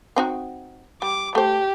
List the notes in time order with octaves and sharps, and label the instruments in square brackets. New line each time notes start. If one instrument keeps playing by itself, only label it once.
[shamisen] C4 D#4 F#4
[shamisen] G3 [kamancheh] D6
[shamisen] A3 C5 [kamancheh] G4